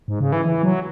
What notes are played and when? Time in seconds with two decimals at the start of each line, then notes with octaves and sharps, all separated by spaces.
0.08 G#2
0.20 C#3
0.32 E3
0.45 E3
0.63 F#3